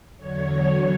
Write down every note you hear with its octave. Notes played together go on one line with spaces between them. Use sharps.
E2 D3 F#3 C#5